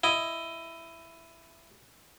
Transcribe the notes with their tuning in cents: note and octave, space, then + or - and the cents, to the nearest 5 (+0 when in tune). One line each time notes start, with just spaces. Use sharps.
E4 +10 D#5 +10